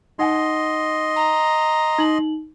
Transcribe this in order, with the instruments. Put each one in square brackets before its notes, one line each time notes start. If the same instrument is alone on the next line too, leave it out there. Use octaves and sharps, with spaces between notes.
[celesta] D#4 F#5 G#5 [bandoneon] D#5 C6
[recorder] A#5
[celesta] D#4 F#7